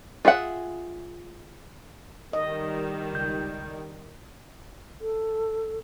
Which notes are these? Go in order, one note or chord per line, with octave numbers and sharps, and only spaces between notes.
F4 G#4 E5 F#5
D#3 G3 D#5
C#2 G6
A4